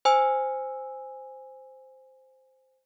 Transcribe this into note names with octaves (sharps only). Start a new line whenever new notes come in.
C5 G#5 E6